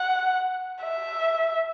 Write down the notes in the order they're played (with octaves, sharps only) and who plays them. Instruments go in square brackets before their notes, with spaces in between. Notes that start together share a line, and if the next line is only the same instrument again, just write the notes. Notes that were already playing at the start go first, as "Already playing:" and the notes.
Already playing: [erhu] F#5
E5